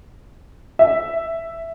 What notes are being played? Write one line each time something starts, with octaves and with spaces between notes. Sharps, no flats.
E5